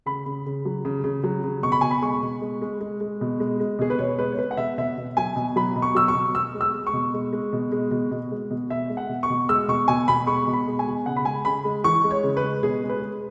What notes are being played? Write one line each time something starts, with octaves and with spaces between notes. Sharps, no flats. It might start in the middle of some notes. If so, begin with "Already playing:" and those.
C#3 B5
C#3
C#3
F#3
C#3
C#3
F#3
C#3
B2 C#6
B5
B2 G#5
B5
G#3 C#6
B2
G#3
G#3
G#3
G#3
B2
G#3
G#3
B2 G#4
B4
B2 C#5
G#3 B4
C#5
G#3 B4
F#5
B2 E5
B2 E5
B2
F#3 G#5
B2
F#3 B5
B2
C#6
F#3 E6
C#6
B2
B2 E6
G#3
E6
G#3
C#6
B2
G#3
G#3
B2
G#3
B2
B2
G#3
B2
B2 E5
G#3
F#5
B2
C#6
B2
G#3 E6
B2 C#6
B2 G#5
B2 B5
G#3 C#6
B2
B5
G#3
G#5
B2
C#3 F#5
B5
G#3 G#5
C#3 B5
G#3
E3 C#6
G#3
C#5
C#3
B4
G#3
B2 G#4
G#3
B4
G#3